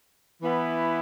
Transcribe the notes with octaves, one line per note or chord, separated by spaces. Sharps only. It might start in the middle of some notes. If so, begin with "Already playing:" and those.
E3 B3 E4